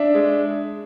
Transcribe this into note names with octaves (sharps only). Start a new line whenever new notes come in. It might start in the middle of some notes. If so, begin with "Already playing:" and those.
Already playing: D4 E5
G#3